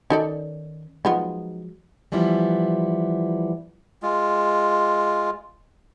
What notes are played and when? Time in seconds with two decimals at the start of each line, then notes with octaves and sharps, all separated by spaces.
0.10 D#3 C#4 D#4 A4 D5
1.05 D#3 F3 F#3 G#3 B3 F4
2.12 E3 F3 G3 B3 E4
4.02 G#3 F4